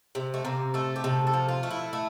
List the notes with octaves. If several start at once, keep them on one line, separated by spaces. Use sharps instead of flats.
C3
A3
C3 A#3
A3 A4
G4
C3 A4
A4
F3
F4
A3
E4
A3